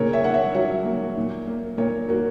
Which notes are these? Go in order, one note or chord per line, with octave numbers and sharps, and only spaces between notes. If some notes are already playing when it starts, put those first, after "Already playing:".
Already playing: A#2 C#3 A#4 C#5
C#5 E5
A#3 F#5
C#5 E5
F#3 C#5 E5
A#3
A#2
A#3
A#2 A#4 C#5
A#3 F#4 A#4